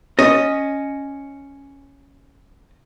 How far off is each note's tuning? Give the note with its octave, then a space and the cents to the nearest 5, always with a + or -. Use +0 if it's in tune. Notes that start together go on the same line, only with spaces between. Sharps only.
C#4 +0 D#5 +0